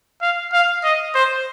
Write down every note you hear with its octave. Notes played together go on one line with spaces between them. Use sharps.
F5
F5
D#5
C5